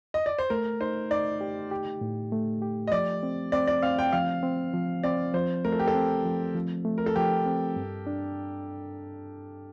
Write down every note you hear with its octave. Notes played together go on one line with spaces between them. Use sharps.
D#5
D5
C5
A3 A#4
D#4 C5
D#4 D5
G4
G4
A2
A3
G4
D#5
F3 D5
C4
C4 D5
D5
C4 F5
G5
F3 F5
C4
F3
C4 D5
F3 C5
A3 A#4
A4
G4
A4
C4
F3
F3
A3
A#4
A4
F3 G4
C4
G2
D4